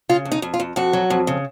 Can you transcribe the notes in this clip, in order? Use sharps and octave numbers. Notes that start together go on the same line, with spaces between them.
C#3 F4
F2
D#4
F2
F4
F2
F2 F#4
F#3
F2
C#3